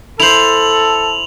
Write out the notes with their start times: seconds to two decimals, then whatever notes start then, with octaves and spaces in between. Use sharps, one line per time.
0.20 E4 A4 C5 F7 F#7